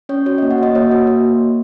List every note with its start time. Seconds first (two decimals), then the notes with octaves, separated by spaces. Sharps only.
0.09 C#4 C#5
0.26 F#4 C#5
0.38 D#5
0.42 A#3
0.51 F#5
0.58 F#4 D#5
0.75 A#3 C#5
0.91 F#4
1.07 A#3